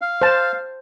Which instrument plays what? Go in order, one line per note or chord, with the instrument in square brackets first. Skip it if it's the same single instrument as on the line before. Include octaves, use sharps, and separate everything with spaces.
[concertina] F5
[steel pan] C5 A5